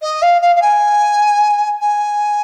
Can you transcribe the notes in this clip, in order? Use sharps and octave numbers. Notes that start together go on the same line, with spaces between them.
D#5
F5
F5
F5
G#5
G#5